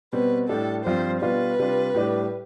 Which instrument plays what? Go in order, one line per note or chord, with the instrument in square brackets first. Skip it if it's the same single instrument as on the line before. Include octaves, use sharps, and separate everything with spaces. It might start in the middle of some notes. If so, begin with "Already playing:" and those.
[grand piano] B2 G3 C4 [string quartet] B4
[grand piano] A2 G3 D4 [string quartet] A4
[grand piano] G2 F3 C4 F4 [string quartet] C5
[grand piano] B2 G3 D4 F4 [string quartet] B4
[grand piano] C3 G3 D4 F4
A2 G3 D4 G4